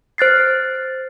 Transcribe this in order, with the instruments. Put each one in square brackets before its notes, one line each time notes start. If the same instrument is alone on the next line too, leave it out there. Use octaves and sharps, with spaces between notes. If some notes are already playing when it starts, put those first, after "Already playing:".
[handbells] C5 F#6 A6 C7